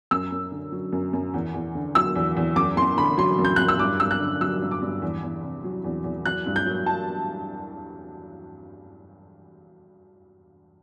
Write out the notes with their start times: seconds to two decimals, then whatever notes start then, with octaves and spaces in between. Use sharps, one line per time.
0.11 F#2 E6
0.32 F#2
0.52 D3
0.72 F#3
0.93 F#2
1.13 F#2
1.34 E2
1.54 E2
1.75 D3
1.95 F#3 E6
2.16 E2
2.37 E2
2.56 F#2 D6
2.77 F#2 C6
2.97 D3 B5
3.17 F#3 C6
3.39 F#2
3.45 G6
3.56 F#2 F#6
3.68 E6
3.79 G2 D6
4.00 G2 E6
4.11 F#6
4.20 D3
4.41 F#3 E6
4.61 G2
4.71 D6
4.82 G2
5.02 E2
5.22 E2
5.44 C3
5.64 F#3
5.84 E2
6.04 E2
6.25 F#3 F#6
6.46 G2
6.56 G6
6.66 F#3
6.86 A5